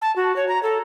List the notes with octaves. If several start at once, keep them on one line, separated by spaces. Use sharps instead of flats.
A5
F#4
C#5
A#5
A4